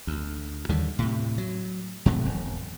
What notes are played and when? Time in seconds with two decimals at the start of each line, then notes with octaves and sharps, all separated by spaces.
0.07 D2
0.69 D#2 D3 D#3 G3
0.99 A2 C3
1.38 F#3
2.06 G#2 C3 F#3 A3
2.25 E1